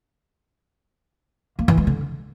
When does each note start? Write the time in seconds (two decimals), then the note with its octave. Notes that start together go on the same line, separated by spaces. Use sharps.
1.59 A#3
1.68 E3
1.78 G#3
1.87 D3